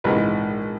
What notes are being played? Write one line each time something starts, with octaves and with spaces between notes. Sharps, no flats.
A#1 G#2 E3 G#3 B4